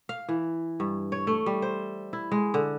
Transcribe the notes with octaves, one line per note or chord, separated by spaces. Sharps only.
F5
E3
G2
C#5
A3
G3
C5
E4
G#3
D3